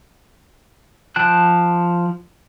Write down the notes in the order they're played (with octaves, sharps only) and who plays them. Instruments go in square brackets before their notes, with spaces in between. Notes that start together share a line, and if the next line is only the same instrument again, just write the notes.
[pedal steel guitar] F3 G5 A5 F#6